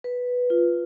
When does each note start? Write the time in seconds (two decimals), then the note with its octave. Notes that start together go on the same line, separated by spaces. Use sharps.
0.04 B4
0.50 F4